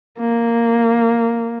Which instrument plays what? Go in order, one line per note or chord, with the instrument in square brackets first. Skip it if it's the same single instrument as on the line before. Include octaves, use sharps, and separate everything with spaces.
[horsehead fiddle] A#3